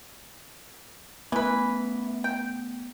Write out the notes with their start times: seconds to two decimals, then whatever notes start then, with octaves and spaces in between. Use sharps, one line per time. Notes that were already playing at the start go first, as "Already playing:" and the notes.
1.32 E3 A3 B3 B4
2.24 G5